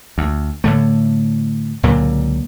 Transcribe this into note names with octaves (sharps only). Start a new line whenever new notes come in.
D2
A2 D3 A3
C#2 A#2 D3 F#3